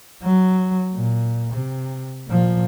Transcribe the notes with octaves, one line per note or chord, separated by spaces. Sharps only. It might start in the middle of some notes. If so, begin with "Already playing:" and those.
F#3
A#2
C3
A#2 F3